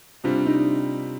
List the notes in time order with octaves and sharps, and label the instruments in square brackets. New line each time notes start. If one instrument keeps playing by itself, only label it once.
[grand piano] C3 G3 C4 [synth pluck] D4 F4
[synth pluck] D#4